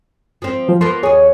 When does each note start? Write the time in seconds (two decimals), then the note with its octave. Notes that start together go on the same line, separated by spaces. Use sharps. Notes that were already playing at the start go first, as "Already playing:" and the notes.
0.42 F3 C4
0.68 F3
0.81 F3 A#3 B3 C6
1.03 D#2 G#4 C#5